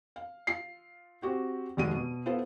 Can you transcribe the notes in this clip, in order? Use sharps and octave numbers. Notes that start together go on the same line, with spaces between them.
F5
F4 C7
C4 F#4 G4
F1 D#2 G#3 F#4 D#7
B2
B3 E4 F4 A4 C5